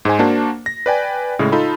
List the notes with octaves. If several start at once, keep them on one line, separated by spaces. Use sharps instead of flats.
G#2 G#3 C5 G#5
A#3 D4 F#4 C5 A5
A#6
B4 D5 G5 G#5
A2 C#3 G#3
D#4 F4 A4 B5